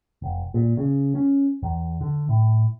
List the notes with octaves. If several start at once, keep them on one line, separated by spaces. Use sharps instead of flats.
F1
A#2
C#3
C#4
E2
D3
A2